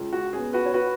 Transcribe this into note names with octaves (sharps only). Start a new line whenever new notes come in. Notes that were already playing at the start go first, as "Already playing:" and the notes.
Already playing: C#2
F#4
C#3 B3 G#4
F#4 B4
C#5
F#4 B4